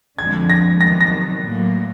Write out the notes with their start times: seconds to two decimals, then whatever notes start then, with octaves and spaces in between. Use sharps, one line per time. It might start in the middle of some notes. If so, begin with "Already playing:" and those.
0.19 F2 D3 F3 G#3 G#6
0.50 A#6
0.80 C3 D#3 F#3 A#6
1.01 A#6
1.42 A2 F#3 A#3